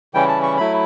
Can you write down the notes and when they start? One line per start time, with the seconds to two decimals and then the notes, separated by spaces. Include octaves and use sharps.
0.14 C#3 E3 G3 C#4 E4 G5
0.28 A5
0.43 C#6
0.57 F#3 A3 E4 B5